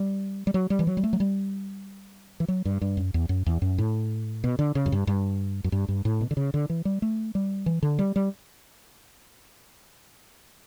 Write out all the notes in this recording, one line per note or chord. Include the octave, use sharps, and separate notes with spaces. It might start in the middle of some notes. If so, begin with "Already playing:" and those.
Already playing: G3
G3
F#3
G3
E3
F#3
G3
A3
F#3
G3
E3
F#3
G2
G2
F#2
E2
F#2
E2
F#2
A2
B2
D3
C#3
F#2
G2
G2
F#2
G2
G2
A2
B2
D3
C#3
D3
E3
G3
A3
G3
E3
D3
G3
G3